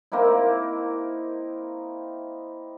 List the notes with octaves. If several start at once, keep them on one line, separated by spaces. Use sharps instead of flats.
A#3 C4 D#4 E4